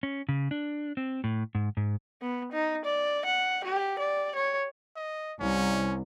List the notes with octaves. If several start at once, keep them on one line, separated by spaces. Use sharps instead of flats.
C#4
C#3
D4
C4
A2
G#2
G#2
B3
D#4
D5
F#5
G4
D5
C#5
D#5
C2 C#4